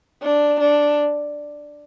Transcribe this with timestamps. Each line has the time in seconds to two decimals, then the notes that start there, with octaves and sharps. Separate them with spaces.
0.22 D4
0.60 D4